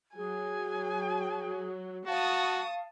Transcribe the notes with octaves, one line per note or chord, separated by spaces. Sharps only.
F#3 G#4 G#5
F#4 F5 A5 C#6 D#6